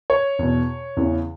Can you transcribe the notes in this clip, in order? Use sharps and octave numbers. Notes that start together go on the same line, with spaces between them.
C#5
E2 B2
E2 C#3 E3